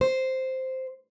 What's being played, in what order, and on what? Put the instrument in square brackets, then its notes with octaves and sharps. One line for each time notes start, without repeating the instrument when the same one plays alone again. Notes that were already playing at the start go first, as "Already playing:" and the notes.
[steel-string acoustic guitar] C5